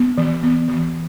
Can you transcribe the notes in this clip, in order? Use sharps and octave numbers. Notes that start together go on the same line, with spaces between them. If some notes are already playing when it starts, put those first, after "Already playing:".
Already playing: B3
E3
B3
E3